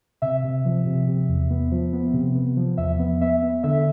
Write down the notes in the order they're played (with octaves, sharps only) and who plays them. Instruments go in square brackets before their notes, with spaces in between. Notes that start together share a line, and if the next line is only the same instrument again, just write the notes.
[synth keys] C3 E5
C3
F3
C3
C3
E2
B3
F3
B3
C3
B3
F3
E2 E5
B3
B3 E5
B3
D3 E5